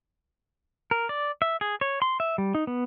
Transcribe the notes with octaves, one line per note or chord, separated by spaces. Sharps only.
A#4
D5
E5
G#4
C#5
C6
E5
G3
D#4
B3